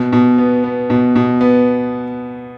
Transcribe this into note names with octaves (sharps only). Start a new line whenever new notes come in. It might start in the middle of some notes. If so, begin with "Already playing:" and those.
Already playing: B2
B2
B3
B3
B2
B2
B3